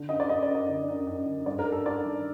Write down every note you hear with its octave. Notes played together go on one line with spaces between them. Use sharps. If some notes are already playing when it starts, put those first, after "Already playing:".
Already playing: D3
F#2 D#5
D5
F#2 D#5
D5
F#2
D5
D3
F#2
F#2
D3
G2 D5
A#4
G2
A4
G2 D5
D#3